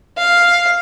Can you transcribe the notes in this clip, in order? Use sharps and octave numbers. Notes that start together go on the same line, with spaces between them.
F5